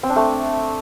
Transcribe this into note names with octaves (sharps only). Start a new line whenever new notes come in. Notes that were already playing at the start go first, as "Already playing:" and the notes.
C4
D4
A3